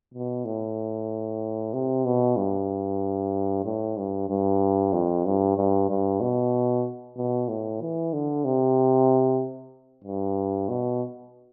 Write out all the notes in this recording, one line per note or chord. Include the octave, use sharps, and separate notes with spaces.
B2
A2
C3
B2
G2
A2
G2
G2
F2
G2
G2
G2
B2
B2
A2
E3
D3
C3
G2
B2